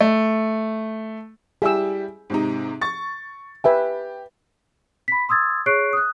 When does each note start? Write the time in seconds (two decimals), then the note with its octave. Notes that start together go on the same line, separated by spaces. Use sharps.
0.01 A3
1.62 G3 E4 G4 G#4 E6
2.30 G#2 C3 D#4
2.81 C#6 A6
3.64 G4 B4 E5 G#5
5.08 B5 B6
5.29 C6 D#6 E6 G#6 A6
5.66 G#4 C#5 C#6 F#6 C7 D7
5.93 D#6 F#6